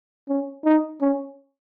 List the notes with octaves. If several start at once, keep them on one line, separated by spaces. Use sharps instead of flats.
C#4
D#4
C#4